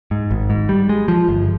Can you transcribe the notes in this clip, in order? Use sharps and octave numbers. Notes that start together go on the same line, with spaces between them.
G#2
G#1
G#2
G3
G#3
F3
G1